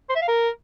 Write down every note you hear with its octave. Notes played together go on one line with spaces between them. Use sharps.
C5
E5
F5
A#4